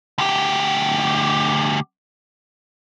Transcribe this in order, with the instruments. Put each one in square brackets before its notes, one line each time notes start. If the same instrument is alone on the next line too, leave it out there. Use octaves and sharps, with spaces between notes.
[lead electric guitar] D2 G4